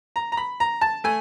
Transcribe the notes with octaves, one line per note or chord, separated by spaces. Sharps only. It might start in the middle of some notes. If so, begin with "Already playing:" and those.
A#5
A#5
B5
A#5
A5
A3 G#5